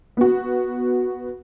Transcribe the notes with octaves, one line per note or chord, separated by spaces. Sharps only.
B3 F#4